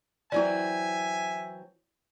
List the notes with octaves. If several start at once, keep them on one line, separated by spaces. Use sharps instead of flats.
E3 F#3 C4 E4 D5 E5 G#5